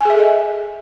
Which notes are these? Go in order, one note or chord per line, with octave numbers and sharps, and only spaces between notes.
G#4 A4 D#5 E5 G#5